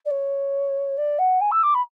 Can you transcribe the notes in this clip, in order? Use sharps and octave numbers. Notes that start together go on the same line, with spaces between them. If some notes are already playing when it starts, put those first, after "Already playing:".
D5
C#5
D5
F#5
G#5
E6
D6
B5